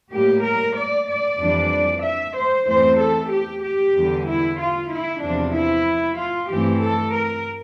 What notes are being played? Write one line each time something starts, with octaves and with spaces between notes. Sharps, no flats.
A2 G3 A#3 G4
A#4
D5
D5
F2 E3 G3 D4
E5
C5
E2 E3 A3 C4 C5
A4
G4
G4
E2 D3 G3
E4
F4
E4
E2 C3 F3 D4
E4
F4
G2 E3 A3 C4 G4
A4
A#4